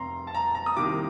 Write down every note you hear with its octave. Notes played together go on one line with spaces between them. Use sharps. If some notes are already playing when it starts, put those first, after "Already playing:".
Already playing: F1 C3 A#5 C6
A5
A#5
A#5
D#6
C2 C3 D#3 A#3 D6